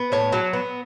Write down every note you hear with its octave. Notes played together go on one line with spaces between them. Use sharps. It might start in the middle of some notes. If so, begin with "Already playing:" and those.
Already playing: B3
A2 C#5
F#3
B3